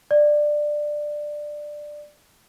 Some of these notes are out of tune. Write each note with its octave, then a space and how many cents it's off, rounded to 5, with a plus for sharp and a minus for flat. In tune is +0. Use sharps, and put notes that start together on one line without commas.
D5 +15